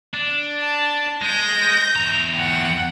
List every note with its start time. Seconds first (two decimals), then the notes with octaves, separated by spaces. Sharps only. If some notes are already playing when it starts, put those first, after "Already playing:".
0.14 D4
0.61 A5
1.22 G#3 G6 A#6
1.96 E2 A#5
2.35 F#5 G5